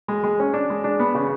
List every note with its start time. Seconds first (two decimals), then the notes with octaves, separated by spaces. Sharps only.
0.08 G#3
0.24 G#3
0.40 C#4
0.54 D4
0.70 G#3
0.84 D4
1.00 B3
1.15 C#3